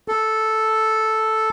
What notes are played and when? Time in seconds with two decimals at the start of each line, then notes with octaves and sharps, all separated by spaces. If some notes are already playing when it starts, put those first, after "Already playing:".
0.08 A4